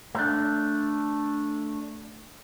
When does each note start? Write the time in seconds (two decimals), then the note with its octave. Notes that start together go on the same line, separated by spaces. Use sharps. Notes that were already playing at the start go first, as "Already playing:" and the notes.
0.15 A3 D4